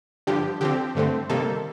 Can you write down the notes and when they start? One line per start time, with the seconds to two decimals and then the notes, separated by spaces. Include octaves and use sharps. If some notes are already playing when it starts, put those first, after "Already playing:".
0.27 G2 D3 F3 G4
0.61 D3 F3 C4 G4
0.95 G2 D3 A3 C4
1.30 C3 D#3 G3 A#3 A4